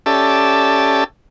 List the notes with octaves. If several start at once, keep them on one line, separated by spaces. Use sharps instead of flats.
C#4 G4 A4 D5 E5 A5